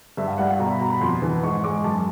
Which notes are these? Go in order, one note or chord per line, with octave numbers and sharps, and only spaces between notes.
G2 E5
F5
G3 F#5
F5
B2 A#5
B5
B2 A#5
B5
F2 C6
E3
G#2 C#6
G#3 D6
F#2 A5